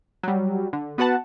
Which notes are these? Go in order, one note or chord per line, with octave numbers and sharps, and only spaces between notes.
F#3 G3
D3
B3 F#4 B4 F#5 A5